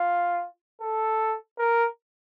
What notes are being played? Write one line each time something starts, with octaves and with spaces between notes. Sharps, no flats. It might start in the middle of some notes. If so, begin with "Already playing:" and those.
Already playing: F4
A4
A#4